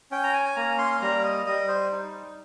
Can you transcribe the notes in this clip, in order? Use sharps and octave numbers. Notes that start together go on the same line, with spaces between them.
C#4 G5
A#5
G#5
G#5
A#3 A#5
C6
G3 A#5
D#5
G3 D#5
C5
D#4